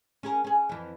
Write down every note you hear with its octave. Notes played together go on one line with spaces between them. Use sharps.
C#4 G#4 A#4
C#4 G#4
F2 E3